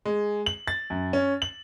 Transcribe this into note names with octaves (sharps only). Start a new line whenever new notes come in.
G#3
F#7
A6
F#2
C#4
F#7